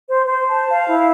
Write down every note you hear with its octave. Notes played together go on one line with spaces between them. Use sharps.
C5
C5
A5
F5
E4